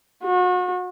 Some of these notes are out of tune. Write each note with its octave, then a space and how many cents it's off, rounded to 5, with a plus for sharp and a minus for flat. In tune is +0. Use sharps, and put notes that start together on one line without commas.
F#4 -35